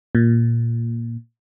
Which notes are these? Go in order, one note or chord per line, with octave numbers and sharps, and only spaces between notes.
A#2